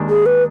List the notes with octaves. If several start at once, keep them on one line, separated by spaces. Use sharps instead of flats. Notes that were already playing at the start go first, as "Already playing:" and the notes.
Already playing: D#2 D#3 G#3 D4
G#4
B4